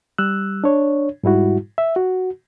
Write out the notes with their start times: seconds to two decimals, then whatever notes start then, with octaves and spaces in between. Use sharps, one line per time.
0.18 G3 E6 F#6
0.64 D4 C#5
1.24 G#2 G3 E4 F#4
1.78 E5
1.96 F#4